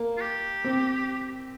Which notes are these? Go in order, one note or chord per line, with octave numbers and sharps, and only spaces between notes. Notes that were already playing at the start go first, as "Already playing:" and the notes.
Already playing: A#3
F4
G4
C4